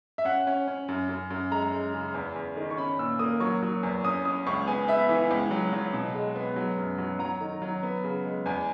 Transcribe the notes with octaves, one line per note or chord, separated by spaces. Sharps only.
E5
C#4 F#5
C#4
C#4
F#2
F#2
F#2
G#3 A#5
G#3
C#3
E2
E2
D#3
C#6
C#4 B5
A#2 E6
A#3 D#6
F#3 C#6
F#3
E2
C#4 D#6
C#4 D#6
C#2 C#6
B3 G#5
B3 E5
E3
C#2
F#3
F#3
B2
G#3
B3
F#3
F#2
F#3
F#3 A#5
D#3
F#3
B3
C#3
G#3
E2 G#5